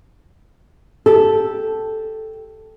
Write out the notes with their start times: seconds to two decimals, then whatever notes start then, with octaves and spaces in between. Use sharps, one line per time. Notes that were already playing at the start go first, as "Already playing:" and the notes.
1.06 G4 A4